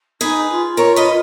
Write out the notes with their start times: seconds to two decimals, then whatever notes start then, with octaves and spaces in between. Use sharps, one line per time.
0.21 D#4 G#4 B4
0.50 F4
0.77 A#4 C#5
0.96 B4 D#5